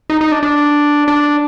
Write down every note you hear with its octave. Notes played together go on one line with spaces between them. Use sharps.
D#4
D#4
D4
D4
D4